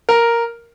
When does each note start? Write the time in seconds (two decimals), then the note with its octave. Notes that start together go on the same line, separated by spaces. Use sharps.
0.09 A#4